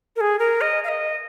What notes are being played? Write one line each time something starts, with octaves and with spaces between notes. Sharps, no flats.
A#4
G#4
A#4
D#5
F5
D#5